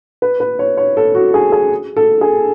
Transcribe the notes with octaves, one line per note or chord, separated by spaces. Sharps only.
B4
B4
C#5
C#5
A4
F#4
G#4
G#4
A4
G#4